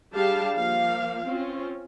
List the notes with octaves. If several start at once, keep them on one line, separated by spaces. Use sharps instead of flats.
G3 D4 G4 G#4 F5 A5
F3 A#3 F5
C4 C#4 F4